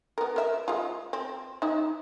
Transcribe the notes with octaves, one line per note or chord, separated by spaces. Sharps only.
B3 A#4
A#4 E5
G#3 F4
C4
D#4 E4